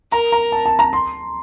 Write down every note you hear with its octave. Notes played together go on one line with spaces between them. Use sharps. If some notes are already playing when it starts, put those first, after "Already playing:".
A#4 A#5
A#5
A5
A5
A#5
C6